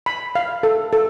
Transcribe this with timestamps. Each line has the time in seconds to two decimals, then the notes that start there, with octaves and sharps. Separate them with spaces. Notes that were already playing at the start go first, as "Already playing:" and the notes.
0.06 B5
0.35 F5
0.63 A4
0.93 A4